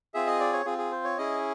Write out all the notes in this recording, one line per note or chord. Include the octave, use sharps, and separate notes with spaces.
C4 F4 G#4 E5
D#5
D5
C#5
C4 F4 G#4
G#4
C5
C#5
C#4 E4 G#4 D#5